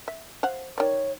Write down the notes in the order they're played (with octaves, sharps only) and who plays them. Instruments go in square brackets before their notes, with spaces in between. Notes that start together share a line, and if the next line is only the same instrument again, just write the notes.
[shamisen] E5
C5 F5 F#5
[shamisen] D#3 D5 [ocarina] C#5